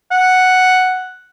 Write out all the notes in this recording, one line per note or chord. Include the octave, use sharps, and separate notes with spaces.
F#5